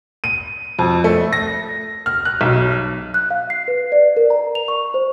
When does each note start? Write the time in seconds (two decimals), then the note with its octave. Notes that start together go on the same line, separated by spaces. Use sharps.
0.24 D#7
0.79 F2
1.04 A3
1.33 A#6
2.06 F6
2.25 F#6
2.41 B1
3.14 F#6
3.31 F5
3.50 C7
3.68 B4
3.92 D5
4.17 A#4
4.30 A#5
4.55 F7
4.68 C#6
4.94 C5